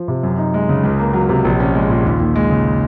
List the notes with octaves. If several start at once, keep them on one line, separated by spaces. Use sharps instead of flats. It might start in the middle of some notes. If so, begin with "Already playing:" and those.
Already playing: F3
C3
F#2
D#4
G#3
C#3
C#2
A#3
F#3
C3
A#1
C#4
G#3
A#2
D#2
D#2
G#3
C#3